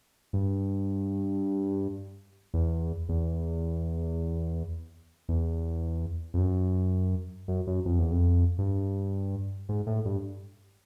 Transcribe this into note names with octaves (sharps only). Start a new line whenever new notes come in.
G2
E2
E2
E2
F2
F#2
F#2
F#2
F2
E2
F2
G2
G#2
A2
G2